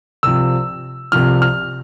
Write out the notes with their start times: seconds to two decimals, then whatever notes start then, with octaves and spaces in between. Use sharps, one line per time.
0.23 C2 C3 F3 E6
1.12 C2 C3 F3 F6
1.42 F6